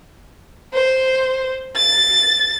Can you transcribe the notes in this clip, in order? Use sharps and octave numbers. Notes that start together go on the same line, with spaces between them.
C5
A6